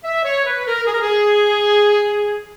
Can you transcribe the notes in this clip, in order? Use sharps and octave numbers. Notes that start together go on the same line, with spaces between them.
E5
C#5
B4
A#4
G#4
A#4
G#4